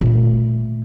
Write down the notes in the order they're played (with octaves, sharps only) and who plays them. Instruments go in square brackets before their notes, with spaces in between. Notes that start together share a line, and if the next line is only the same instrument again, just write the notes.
[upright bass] A#2 A3